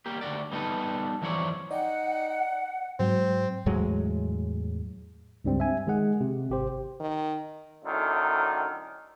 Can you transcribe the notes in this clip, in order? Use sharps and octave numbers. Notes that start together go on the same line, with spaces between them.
G3 A#3 G4
D2 G2 F#4 D5
G3 B3 D#4 F#4 A4 B4
F2 E3 F#3 C4 C#5 D5
D#4 D5 F#5 G5
G#2 F#3 C4
E2 A2 F#3 G#3
C#2 G2 G3 C4
E5 G#5
D#3 G#3 G#4 F#5
C3
G#1 G4 C5
D#3
F#2 A2 D3 D#3